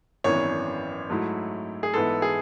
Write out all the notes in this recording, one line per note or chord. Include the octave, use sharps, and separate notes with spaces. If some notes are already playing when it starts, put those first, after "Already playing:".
G#1 F#2 E3 B3 D4 C#5
G#2 F#3 A3 E4
G#4
G#2 E3 B3 E4 A4
G#4